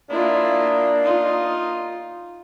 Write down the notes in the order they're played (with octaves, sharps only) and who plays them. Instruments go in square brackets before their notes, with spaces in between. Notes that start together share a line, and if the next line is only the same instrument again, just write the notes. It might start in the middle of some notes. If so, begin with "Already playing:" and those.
[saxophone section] A#3 D4 D#5 [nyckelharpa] E4 F4
[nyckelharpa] D#4 F4